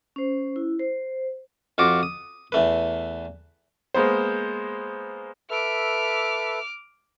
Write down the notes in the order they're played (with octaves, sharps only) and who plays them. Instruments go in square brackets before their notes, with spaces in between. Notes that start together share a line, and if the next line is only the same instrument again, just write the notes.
[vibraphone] C#4 C5
E4
C5
[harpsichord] F2 F4 F#4 D6
D#6
E2 A3 B4
[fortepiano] G#3 A#3 B3 C5
[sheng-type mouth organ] A4 B4 E5 [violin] D6 F6